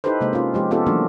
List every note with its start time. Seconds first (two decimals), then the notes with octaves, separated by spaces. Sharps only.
0.04 D#4 E4 G4 A4 B4 C5
0.21 C3 G#3 A#3 C5
0.33 C#4 F4
0.54 F3 G#3 G4
0.71 B3 C#4 F4 G4 A4
0.86 E3 F#3 A3 A#3 D4 F#4